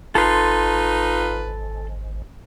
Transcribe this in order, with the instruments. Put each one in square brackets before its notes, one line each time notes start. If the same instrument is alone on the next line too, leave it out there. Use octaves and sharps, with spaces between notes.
[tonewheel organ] G#1 [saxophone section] D#4 F4 B4 [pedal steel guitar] A4 C6